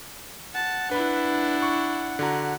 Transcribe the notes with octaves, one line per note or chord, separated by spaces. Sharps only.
F#5 A5
D4 E4 B4 B5
C#6
D3 F#4 A#5